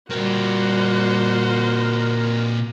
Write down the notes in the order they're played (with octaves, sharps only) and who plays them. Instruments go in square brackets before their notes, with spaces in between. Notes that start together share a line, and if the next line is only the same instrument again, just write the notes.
[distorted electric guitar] A#2 C4 [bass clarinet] G3 [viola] F#4 C5 [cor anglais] A#4